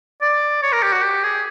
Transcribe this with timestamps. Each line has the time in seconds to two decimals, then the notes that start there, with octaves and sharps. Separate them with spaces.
0.22 D5
0.63 C#5
0.73 A#4
0.83 G4
0.93 F#4
1.03 G4
1.24 G#4